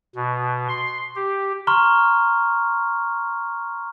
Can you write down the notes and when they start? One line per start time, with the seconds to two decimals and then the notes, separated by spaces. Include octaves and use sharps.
0.15 B2
0.69 C6
1.16 G4
1.67 A#5 C6 C#6 F6